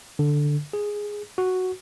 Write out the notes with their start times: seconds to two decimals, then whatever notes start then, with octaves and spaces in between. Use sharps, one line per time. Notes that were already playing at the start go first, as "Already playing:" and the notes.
0.19 D3
0.73 G#4
1.38 F#4